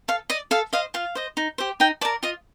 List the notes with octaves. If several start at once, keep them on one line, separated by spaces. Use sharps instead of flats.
A4 F5
D5 D#5
A4 F5
C5 D#5 F5
F4 F5
C5 D#5
D#4
G4 C5
D#4 G5
A#4 D5 A5
F4 D#5